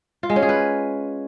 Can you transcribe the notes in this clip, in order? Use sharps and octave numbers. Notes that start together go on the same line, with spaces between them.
F4
G#3
C#4
G#4
B4